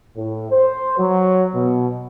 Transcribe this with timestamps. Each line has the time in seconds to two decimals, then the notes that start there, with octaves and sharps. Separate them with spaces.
0.15 A2
0.51 C5
0.98 F#3
1.55 B2